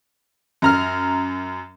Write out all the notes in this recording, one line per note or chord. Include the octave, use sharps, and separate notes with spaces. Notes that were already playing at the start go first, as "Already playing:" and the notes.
F#2 A#5 F6